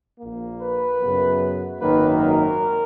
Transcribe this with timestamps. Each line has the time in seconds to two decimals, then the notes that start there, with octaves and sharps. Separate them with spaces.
0.19 A#1 A#2 A#3
0.59 B4
0.99 F#2 C#3 F#3 B3
1.79 G#1 F#2 D#3 F#3 A#3 B4
2.20 A#4